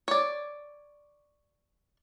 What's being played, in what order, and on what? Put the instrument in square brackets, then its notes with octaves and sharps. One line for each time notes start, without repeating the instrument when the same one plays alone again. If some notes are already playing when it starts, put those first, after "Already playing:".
[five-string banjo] C#5 D5